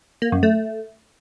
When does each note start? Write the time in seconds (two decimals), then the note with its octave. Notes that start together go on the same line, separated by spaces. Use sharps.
0.22 A#3
0.32 F#2
0.43 A3